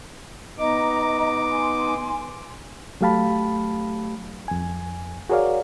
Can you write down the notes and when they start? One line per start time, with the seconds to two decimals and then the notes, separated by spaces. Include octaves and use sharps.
0.58 B3 D#4 D#5 A#5 D6
1.51 G#5 C6
3.01 F#3 A3 G4 F5 A5 B5
4.48 F2 G#5
5.30 F#4 G#4 A#4 C#5 D5 F5